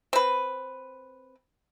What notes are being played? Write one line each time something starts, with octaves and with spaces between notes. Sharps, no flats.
C4 B4